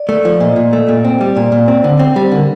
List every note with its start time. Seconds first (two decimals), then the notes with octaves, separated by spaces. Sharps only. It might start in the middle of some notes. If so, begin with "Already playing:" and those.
Already playing: D5
0.09 A3
0.25 F3
0.40 A#2 D#5
0.56 A#2
0.73 A3
0.88 A#2
1.04 C4
1.21 G3
1.36 A#2 D5
1.52 A#2
1.68 C4
1.84 D3
1.99 C4
2.16 G3
2.32 D3 A#4